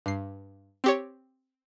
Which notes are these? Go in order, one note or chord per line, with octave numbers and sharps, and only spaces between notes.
G2 C7
C4 G4 C#5